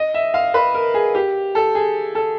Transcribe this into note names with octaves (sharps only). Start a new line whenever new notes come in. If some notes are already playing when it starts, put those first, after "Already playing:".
Already playing: D#5
E5
F5
B4
A#4
G#4
G4
A4
G#4
A4